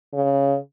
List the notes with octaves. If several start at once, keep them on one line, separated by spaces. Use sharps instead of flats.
C#3